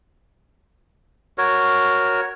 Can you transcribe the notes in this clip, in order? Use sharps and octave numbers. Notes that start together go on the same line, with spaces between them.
F#4 A#4 C#5